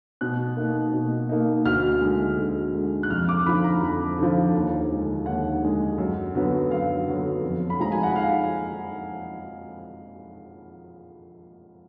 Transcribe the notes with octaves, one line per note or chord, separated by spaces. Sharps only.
B2 F#6
A#3 D#4
B2
A#3 D#4
D2 F6
D3 G#3
D2
D3 G#3
F#6
F2 F6
D6
D3 F3 B5
A#5
F2
D3 F3
D#2
D3 G#3
D#2 F#5
D3 G#3
F#2
D3 F#3 B3
F#2 F5
D3 F#3 B3
F2
B5
F3 G#3 A#5
G#5
F#5
F5